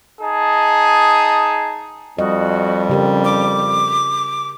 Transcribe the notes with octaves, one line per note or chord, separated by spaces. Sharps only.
D#4 G#4 A5
F2 G3 F#4 D#5
C#3 G4 A#4
D6